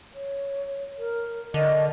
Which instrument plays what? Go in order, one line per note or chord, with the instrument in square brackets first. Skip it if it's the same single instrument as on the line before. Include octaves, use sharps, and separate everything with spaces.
[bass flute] C#5
A#4
[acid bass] D3 [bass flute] A#4 [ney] D#5